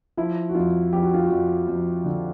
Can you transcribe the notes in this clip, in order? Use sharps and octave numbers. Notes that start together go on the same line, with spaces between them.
F3 E4
F#4
F2 F4
F2 G4
F#4
F4
F#4
F2
F2
D3